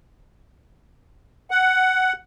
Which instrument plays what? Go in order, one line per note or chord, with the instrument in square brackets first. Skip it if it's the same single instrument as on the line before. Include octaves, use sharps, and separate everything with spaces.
[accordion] F#5